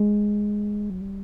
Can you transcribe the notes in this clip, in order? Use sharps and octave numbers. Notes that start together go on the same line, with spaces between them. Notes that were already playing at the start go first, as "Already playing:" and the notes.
Already playing: G#3
F#3
G3